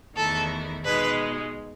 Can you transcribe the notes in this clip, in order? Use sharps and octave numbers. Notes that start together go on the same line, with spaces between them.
E2 D#3 A3 E4 A4
B2 G#3 D#4 B4